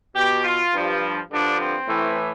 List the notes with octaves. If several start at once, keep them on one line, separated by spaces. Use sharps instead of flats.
B2 G4
F4
G2 F3
G2 D3 F3 D4
C4
A2 E3